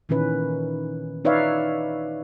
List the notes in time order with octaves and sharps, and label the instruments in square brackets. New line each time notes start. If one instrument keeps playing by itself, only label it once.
[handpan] A#2 D#3 E3 C#4 B4
D#4 B4 C#5 D5 E5 F5